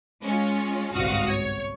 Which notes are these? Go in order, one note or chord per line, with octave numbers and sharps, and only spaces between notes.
G#3 C#4 F4
G1 C2 G#2 F#4 F5 D#6
C#5